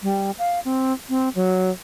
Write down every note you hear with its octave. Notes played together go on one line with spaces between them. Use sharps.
G3
F5
C4
C4
F#3